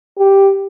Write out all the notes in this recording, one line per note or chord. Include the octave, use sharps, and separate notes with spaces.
G4